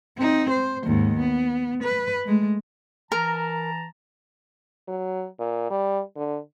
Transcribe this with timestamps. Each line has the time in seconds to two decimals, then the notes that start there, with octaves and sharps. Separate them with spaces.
0.17 C4 D#4
0.50 C5
0.86 D#2 G#2
1.19 B3
1.83 B4
2.25 G#3 A3
3.12 E3 A#4 A5 A#5
4.88 F#3
5.40 A#2
5.70 G3
6.16 D3